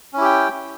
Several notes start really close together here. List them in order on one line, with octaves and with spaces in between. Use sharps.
C#4 E4 G4 G5